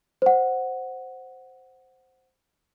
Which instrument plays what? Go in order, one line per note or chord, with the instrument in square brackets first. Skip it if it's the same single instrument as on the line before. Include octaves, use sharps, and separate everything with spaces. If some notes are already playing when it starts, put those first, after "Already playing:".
[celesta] C5 F#5